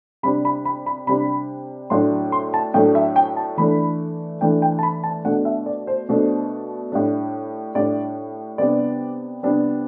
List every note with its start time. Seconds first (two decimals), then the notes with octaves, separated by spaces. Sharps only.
0.23 C3 G3 D4 B5
0.45 B5
0.65 B5
0.86 B5
1.07 C3 G3 D4 B5
1.90 A2 F#3 A3 D4 C6
2.32 C6
2.54 A5
2.74 A2 F#3 A3 D4 G5
2.95 E5
3.16 G5
3.37 A5
3.57 E3 A3 D4 B5
4.41 E3 A3 D4 G5
4.62 G5
4.79 A5
4.83 B5
5.04 A5
5.24 B2 A3 D4 F#5
5.45 E5
5.66 D5
5.87 C5
6.09 B2 A3 D4
6.92 A2 G3 D4
7.75 A2 G3 D4 D5
8.58 C3 G3 B3 D4 D5
9.43 C3 G3 B3 D4